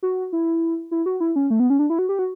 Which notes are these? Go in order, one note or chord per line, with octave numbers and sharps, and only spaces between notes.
F#4
E4
E4
F#4
E4
C#4
A3
B3
C#4
D4
E4
F#4
G4
F#4